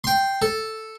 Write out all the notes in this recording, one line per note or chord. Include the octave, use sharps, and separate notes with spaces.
G5 C6
A4